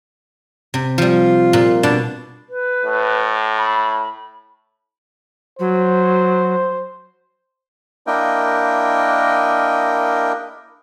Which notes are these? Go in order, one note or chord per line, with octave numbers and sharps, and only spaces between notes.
C3
F3 G3 F4
A#2
B2 D4 A5
B4
A2
B5
F#3 C5
A#3 D4 E4 A#4 D#5 G5